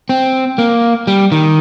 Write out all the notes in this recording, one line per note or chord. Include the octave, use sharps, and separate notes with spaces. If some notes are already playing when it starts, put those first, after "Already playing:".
C4
A#3
G3
D#3